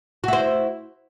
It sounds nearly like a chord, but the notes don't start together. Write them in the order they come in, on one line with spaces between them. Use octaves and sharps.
F#4 E4 C5